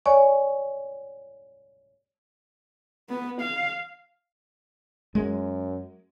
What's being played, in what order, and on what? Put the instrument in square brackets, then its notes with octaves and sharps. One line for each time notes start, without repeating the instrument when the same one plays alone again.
[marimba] C#5 D5 G#5 C#6
[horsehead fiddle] B3
F5
[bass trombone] F#2 [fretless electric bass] G#3